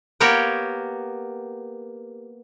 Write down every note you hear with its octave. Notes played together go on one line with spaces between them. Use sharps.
A#3 B3 G4 A#4 C#5 G5